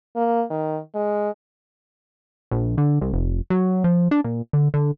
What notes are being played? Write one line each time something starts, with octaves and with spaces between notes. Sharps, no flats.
A#3
D#3
G#3
A#1
D3
C2
F1
F#3
F3
D4
A#2
D3
D3